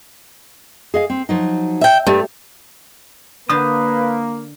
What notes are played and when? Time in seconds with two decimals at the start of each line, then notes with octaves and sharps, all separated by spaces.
0.94 G#4 D#5 F5
1.10 C4
1.29 F3 F#3 D#4
1.81 E5 G5
2.07 G2 A3
3.49 D3 A#3 B4 C5 A5 D#6